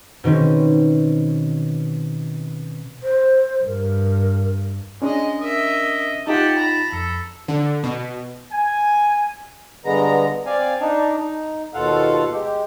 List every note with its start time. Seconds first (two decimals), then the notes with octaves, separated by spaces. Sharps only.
0.24 B2 D#3 C4 C#4
3.03 C5
3.64 G2 A#4
5.02 G#3 C#4 D4 D#5
5.40 A#4 D#5 E5
6.27 D#4 F4 G4 F#5 A5
6.58 A#5 B5
6.92 F2 A4
7.48 D3
7.84 B2
8.51 G#5
9.85 G2 D3 G#3 B3 A#5
10.46 C4 D5 F5 G#5
10.80 D4 D#4
11.19 D#4
11.74 D#2 B2 F4 A4 F5 F#5
12.32 G#3 G4